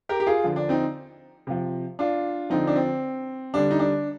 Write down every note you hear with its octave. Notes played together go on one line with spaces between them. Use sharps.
G4 A#4
G4
F4 G#4
D3 F3
D4
C4 D#4
C3 F3
D4 F4
D3 F3 C4 D#4
D4
C4
D3 G3 D4
D#4
D4